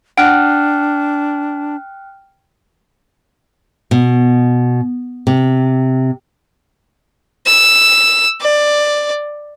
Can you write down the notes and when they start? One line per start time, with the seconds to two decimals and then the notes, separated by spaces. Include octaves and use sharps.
0.18 D4 F#5 G5 F6 F#6
3.91 B2
5.27 C3
7.46 E6
8.41 D5